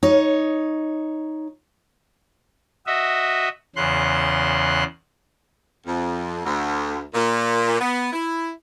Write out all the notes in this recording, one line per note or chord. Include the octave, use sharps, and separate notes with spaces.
D#4 C#5
F#4 D#5 E5
E2 C#3 C6 F#6
F2
D2
A#2
B3
E4